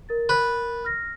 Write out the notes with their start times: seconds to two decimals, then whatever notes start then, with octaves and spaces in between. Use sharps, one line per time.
0.09 A#4 A6
0.29 B4
0.85 F6 A#6